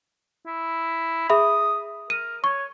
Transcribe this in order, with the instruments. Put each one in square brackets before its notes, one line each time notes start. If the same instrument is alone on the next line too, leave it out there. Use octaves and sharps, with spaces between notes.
[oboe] E4
[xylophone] G#4 E5 B5 [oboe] D#6
[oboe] A#4 [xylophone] D#7
[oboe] C#5 [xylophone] C#6